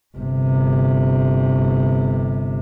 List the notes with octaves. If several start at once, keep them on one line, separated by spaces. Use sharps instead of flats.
G1 C3